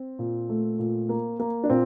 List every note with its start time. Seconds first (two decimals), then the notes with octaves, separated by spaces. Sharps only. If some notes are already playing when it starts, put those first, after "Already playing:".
Already playing: C4
0.19 A#2
0.49 A3
0.79 A#2
1.09 A#3
1.39 A#3
1.64 D4
1.70 A#2 C4